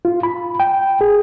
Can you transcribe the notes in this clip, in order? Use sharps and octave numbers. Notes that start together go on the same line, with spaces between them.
F4
B5
G5
G#4